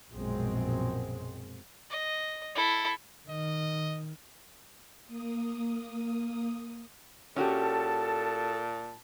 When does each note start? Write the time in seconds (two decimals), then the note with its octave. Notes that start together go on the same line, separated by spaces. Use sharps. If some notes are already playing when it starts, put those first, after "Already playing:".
0.12 A#1 F#2 B2 F#3 G#3 C4
1.90 D#5
2.55 E4 A4
3.29 D#3 D#5
5.06 A#3 D#6
7.36 A#2 C#4 F#4 G4 A4 A5